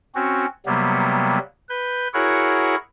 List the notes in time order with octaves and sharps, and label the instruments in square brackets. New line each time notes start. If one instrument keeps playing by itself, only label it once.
[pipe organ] C4 C#4 F#4
C3 F#3 G3 A#3 B3
B4 G6
E4 F#4 G#4 A#4 C#5 F#5